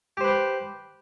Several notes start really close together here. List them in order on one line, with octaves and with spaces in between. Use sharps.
G4 C5 B4 G5